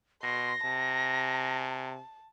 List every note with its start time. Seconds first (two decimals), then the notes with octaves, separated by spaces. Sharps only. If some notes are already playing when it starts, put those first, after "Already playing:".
0.23 B2 C6 A#6
0.65 C3 A5